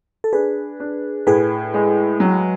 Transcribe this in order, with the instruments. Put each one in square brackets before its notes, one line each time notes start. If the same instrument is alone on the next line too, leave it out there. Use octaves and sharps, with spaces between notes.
[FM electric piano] A4
[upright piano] D4 [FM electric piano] G#4 B4
[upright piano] D4
[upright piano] A2 [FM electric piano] G#4 B4
[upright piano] G#3
F#3